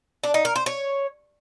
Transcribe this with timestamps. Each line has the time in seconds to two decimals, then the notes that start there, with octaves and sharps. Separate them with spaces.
0.23 D4
0.34 D#4
0.45 A#4
0.56 C5
0.66 C#5